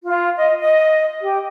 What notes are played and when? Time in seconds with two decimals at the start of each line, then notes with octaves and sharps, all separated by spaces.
0.04 F4
0.36 D#5
0.60 D#5
1.21 G4